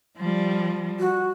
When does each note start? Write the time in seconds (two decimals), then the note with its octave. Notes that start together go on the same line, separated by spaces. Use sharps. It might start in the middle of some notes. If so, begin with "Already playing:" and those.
0.18 F3 G3
1.00 F#4